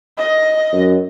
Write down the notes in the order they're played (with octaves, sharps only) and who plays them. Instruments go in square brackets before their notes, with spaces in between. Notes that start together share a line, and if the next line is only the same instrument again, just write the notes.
[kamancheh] D#5
[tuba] F#2